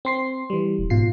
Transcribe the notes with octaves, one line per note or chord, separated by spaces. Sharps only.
C4 C6 C7
E3 G3
D#1
G#2 B2 F4 C7